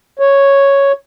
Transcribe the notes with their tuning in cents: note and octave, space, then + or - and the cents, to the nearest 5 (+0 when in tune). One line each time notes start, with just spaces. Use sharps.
C#5 +0